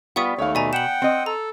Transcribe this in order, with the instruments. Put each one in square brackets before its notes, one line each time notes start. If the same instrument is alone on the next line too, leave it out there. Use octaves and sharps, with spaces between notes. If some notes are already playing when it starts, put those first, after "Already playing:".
[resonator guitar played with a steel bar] G3 B3 F4 [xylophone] F#5 C#6 D#6
[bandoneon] D#2 A3 [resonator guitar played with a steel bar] C#5 F5
[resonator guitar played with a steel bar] B2 [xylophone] D5 G#5 A#5
[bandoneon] F#5 G5 [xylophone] E7 F#7
[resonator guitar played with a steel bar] C4 D#5
[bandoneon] A4 [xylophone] A#5